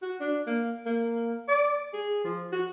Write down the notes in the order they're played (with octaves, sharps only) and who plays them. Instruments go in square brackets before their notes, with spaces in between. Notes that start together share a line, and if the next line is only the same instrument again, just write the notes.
[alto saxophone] F#4
D4
A#3
A#3
D5
G#4
F3
F#4